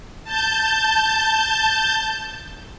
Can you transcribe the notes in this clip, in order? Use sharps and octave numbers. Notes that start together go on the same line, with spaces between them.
A5 G6